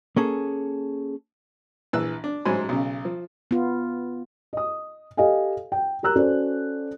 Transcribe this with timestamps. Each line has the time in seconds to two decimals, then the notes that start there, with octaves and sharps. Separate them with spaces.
0.16 A#3 C#4 G#4 A4
1.93 A#1 E3 E6 F#6
2.24 D4
2.45 A1 G#2 F#3 C5 G#5 B5
2.69 B1 C#3
3.05 F3
3.51 B3 F4
4.53 D#5 D#6
5.17 G4 A4 D#5 F5 G#5
5.72 G5
6.03 G4 A#4 A#5 E6 F#6
6.16 C#4 F#4 A4 C5 D5